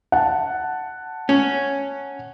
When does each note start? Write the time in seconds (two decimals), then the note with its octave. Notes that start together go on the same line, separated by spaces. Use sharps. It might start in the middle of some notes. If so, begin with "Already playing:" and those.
0.12 F#5 A5
1.29 C#4